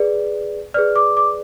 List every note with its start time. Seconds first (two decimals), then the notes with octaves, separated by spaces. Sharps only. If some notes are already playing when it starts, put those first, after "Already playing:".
Already playing: G#4 B4 D5
0.74 G#4 B4 D5 F6
0.96 D6
1.17 D6